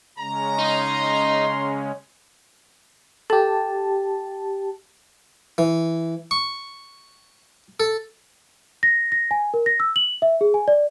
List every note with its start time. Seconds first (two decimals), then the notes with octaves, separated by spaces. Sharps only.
0.19 C#3 G#3 C#4 A#5
0.59 D#4 C6
3.30 G4 A4 A5
5.58 E3
6.31 C#6
7.80 A4
8.83 A#6
9.12 A#6
9.31 G#5
9.54 A#4
9.66 A#6
9.80 E6
9.96 F#7
10.22 E5
10.41 G#4
10.54 G#5
10.68 D5